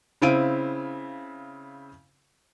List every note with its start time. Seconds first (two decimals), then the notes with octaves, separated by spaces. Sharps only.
0.22 C#3 C4 E4 F5 D7 D#7